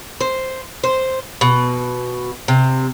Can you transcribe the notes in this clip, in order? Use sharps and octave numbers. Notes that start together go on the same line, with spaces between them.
C5
C5
B2
C3